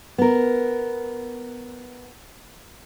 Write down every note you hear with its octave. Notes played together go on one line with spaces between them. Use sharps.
B3 A#4